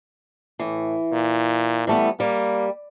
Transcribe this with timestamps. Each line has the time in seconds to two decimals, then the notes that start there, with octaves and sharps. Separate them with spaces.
0.59 A2 E3
1.12 A#2
1.87 E3 G3 A3 B3
2.20 G3 A#3